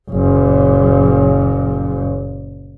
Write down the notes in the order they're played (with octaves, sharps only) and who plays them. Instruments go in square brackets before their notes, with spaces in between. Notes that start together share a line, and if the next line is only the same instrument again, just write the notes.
[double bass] F#1 A#2